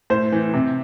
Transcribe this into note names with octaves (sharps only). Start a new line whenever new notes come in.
A2 C5
E3
C3